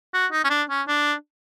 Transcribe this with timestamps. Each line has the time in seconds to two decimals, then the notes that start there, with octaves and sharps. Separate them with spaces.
0.14 F#4
0.32 D#4
0.44 C#4
0.50 D4
0.70 C#4
0.88 D4